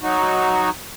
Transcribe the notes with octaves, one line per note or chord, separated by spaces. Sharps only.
F#3 D#4 F#4